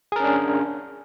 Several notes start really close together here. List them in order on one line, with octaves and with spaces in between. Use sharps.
G#4 A#4 C#4 D4